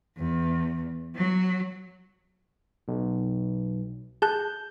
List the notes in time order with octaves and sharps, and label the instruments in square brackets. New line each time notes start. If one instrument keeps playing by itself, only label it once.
[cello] E2
F#3
[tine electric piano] B1
[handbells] G#4 A5 F#6 [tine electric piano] G6